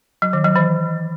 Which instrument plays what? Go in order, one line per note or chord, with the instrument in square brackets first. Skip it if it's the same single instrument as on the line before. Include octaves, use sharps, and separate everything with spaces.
[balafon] F#3
D#3
F#3
E3